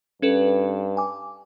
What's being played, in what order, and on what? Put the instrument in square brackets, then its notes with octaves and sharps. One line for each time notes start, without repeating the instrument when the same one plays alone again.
[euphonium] G2 [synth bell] C#4 A4 B4
[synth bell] G#5 D6